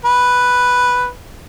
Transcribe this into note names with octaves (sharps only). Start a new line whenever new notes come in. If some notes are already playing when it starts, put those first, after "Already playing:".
B4